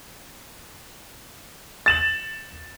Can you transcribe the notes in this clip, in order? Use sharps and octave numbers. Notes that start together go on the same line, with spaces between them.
A6 E7 F#7